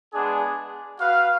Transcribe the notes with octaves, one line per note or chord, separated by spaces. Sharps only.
G#3 B3 D4 G#4
F#4 B4 F5